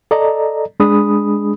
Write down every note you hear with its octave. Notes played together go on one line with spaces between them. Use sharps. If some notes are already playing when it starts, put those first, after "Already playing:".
A4 D5 D#5 A#5
G#3 D4 G#4 B5 D#6